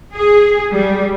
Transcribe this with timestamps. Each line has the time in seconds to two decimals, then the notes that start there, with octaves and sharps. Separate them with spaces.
0.15 G#4
0.73 G3